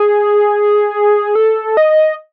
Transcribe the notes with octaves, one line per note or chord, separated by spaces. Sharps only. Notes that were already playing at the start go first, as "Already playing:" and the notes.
Already playing: G#4
A4
D#5